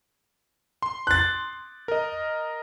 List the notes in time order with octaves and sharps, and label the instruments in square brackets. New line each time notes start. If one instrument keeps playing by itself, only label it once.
[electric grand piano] C6
[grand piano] F#6 A6
[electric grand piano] A#4 D#5